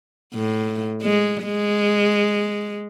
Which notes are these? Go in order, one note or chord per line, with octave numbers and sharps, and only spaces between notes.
A2
G#3
G#3